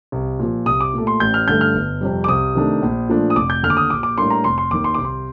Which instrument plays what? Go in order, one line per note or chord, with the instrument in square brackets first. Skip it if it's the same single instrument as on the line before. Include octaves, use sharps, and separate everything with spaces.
[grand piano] C2
A#2 F3
C2 D#6
D6
A#2 A3
C6
A1 G6
F6
G2 D3 A3 G6
F6
G1
F2 C3 G3
D6
C2 D#6
C3 D#3 A3 D4
A#1
A#2 F3 A3 D4
D#6
F1 D6
G6
D#2 D3 F6
D6
D#6
A#1 D6
D6
A2 G3 A#3 D4 C6
A#5
F1 C6
C6
D#2 D#3 D6
C6
C2 D6
C6